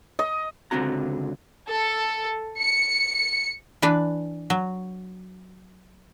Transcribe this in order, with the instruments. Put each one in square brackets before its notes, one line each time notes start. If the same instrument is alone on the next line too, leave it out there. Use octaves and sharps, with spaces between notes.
[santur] D#5
[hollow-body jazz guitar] C#2 D3 C4 F#4 A#5
[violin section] A4
C#7
[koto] E3 D4 B4
F#3